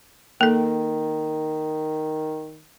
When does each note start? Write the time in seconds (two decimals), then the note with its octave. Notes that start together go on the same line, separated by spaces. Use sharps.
0.41 D#3 A#3 A4